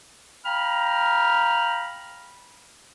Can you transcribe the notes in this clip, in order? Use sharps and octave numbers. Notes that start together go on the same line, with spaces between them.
F5 G5 A#5 B5 F6